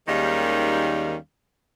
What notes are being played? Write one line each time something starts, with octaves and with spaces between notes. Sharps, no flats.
D#2 D#3 G3 G#3 C#4 F5